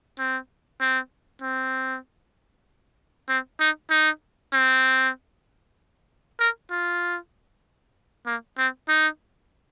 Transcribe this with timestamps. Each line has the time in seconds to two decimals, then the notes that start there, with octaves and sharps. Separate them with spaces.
0.18 C4
0.80 C4
1.42 C4
3.29 C4
3.60 D#4
3.90 D#4
4.53 C4
6.40 A#4
6.71 F4
8.26 A#3
8.58 C4
8.88 D#4